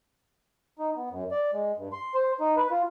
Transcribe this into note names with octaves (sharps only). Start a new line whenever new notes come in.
D#4
B3
F#2
D5
G#3
G2
C6
C5
D#4
B4
F4